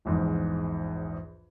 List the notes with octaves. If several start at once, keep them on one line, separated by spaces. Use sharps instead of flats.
A#1 E2 G#2